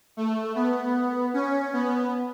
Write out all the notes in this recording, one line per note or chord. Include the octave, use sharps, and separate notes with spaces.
A3
B3
C#4
B3